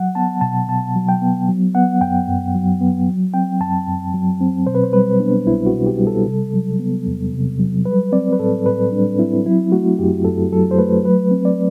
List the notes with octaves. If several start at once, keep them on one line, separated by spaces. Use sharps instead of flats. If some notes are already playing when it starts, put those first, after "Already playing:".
Already playing: F#3 F#5
B3 A5
B2 A5
B2 A5
F#3
G5
B3
F#3
B3 F#5
F#2 G5
F#2
F#3
B3
F#3
C4 G5
F#2 A5
F#2
F#3
C4
B2 C5
B4
C5
G3 B4
B3 D4
C2 E4
F#4
B2
G4
G3
A4
C3
F#3
B3
E2
C3
F#3
G3 B4
C4 D5
B4
A2 A4
A2 B4
G3 D4
C4 E4
F#3 E4
A3 F#4
F#2 G4
F#2 A4
F#3 A4
C5
A3 B4
F#3 B4
C4
D5